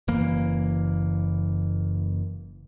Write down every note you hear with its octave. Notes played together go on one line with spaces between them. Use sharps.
F#1 E3 A#3